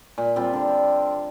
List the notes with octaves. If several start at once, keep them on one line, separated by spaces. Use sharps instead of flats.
A#2
G3 C4 F4
D3